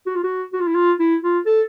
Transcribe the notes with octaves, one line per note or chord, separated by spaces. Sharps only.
F#4
F4
F#4
F#4
F4
E4
F4
E4
F4
A4